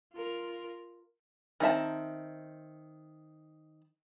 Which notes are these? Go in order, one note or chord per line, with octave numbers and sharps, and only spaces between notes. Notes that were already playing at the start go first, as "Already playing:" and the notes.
F4 A#4
D#3 C4 E5 A5